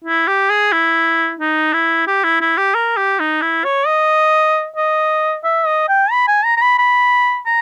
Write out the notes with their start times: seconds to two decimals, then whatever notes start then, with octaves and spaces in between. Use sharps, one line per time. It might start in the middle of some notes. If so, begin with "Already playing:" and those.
0.05 E4
0.27 G4
0.50 G#4
0.72 E4
1.40 D#4
1.73 E4
2.07 G4
2.24 E4
2.41 E4
2.58 G4
2.74 A#4
2.97 G4
3.20 D#4
3.42 E4
3.64 C#5
3.87 D#5
4.76 D#5
5.44 E5
5.66 D#5
5.89 G5
6.11 B5
6.28 G#5
6.45 A#5
6.57 A#5
6.62 B5
6.78 B5
7.46 A#5